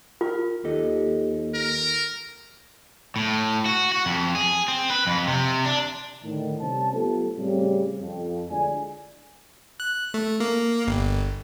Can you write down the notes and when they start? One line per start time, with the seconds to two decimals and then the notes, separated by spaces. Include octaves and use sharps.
0.21 F4 A#4
0.64 D#2 G4 A4 D#5
1.55 A#4
3.16 A2
3.66 F#4
3.92 F#4
4.06 F2
4.35 G#4
4.68 C4
4.90 B4
5.07 F2
5.27 C3
5.65 D4
6.24 A2 D3 D#3
6.60 C3 G3 C#4 C5 C#5 A5
6.93 F#3 A3 B3 F4 G4 A4
7.37 A2 C#3 G3 C4
8.01 F2
8.49 D2 A2 G#3 D4 D5 G#5
9.80 F#6
10.14 A3
10.40 A#3
10.87 G1